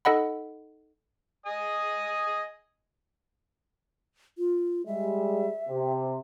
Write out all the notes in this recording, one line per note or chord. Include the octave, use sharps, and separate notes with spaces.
D#4 A4 D#5 F#5 B5
D#5 G#5 D#6
F4
G3 G#3 E5
C3